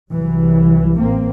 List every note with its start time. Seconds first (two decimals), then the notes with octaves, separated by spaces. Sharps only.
0.12 C2 E3 F#3
0.98 A1 A#3 C4